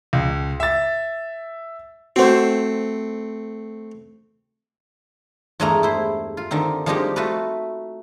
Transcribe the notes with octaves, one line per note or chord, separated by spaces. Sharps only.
C#2
E5 A6
A3 C4 F#4 C5
E2 G2 G#3 A3 A#4 A#5
E4 C5
F4
D3 D#3 C4
F3 G3 G#3 A#3 D#4 G4
A3 F4 F#4 B4